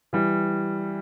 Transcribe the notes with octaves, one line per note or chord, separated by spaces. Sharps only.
E3 G3